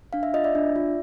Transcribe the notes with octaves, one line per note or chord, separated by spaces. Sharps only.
D4 F5
E5
F4 D#5
D5 E5
D4
F4